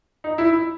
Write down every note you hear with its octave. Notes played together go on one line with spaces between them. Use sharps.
D#4
E4